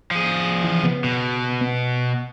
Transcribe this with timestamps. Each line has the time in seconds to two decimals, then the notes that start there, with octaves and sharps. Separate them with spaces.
0.11 F3 G#4
0.64 E3
0.83 C#3 B3
1.04 B2
1.61 B3